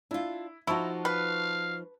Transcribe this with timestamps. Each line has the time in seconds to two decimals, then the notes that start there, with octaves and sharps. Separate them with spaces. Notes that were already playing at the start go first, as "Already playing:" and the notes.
0.11 D4 E4 F4
0.67 F3 D#4 E4 F#4 A5 C#6
1.05 B4 F5